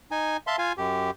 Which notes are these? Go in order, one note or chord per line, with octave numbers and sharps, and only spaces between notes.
D#4 G#5
E5 F5 A5 C6
F4 F5 G#5
F#2 G4